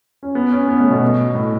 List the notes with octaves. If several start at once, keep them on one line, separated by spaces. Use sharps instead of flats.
C#4
B3
C#4
B3
A3
B2
A2